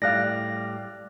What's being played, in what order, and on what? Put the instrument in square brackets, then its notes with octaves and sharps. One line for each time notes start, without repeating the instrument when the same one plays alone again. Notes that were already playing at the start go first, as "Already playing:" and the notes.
[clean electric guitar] A2 G3 [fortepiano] D5 F5 [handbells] F#6 A#6